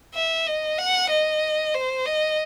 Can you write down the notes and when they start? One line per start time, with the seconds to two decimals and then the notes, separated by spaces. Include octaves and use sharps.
0.14 E5
0.47 D#5
0.79 F#5
1.10 D#5
1.75 C5
2.06 D#5